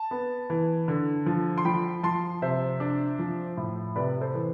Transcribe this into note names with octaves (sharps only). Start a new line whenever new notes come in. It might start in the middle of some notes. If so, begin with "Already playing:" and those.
Already playing: A5
B3
E3
D3
F3
C6
F3 G5 B5
F3 A5 C6
C3 C5 E5
D4
F3
A2
C3 B4 D5
A4 C5
E3